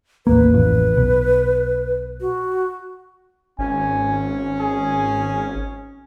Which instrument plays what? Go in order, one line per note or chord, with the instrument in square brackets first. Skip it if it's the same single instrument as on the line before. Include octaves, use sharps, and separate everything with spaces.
[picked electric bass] A1 D#2 A#3 [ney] B4
[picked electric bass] D1 A1 F2
B1
[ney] F#4
[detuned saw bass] G#1 [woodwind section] C#4 [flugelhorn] G#5
[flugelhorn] G#4